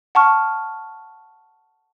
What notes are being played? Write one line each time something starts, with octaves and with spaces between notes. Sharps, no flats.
F#5 A5 C#6 F6